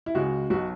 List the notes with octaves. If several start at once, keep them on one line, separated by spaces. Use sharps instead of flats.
E4
C#2 C#3 G#3 F#4
B1 B2 F#3 F#4